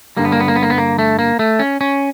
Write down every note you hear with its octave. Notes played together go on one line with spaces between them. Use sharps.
G2 D3 G3 A#3
B3
A#3
B3
A#3
B3
A#3
B3
A#3
A3
A#3
A3
C#4
C#4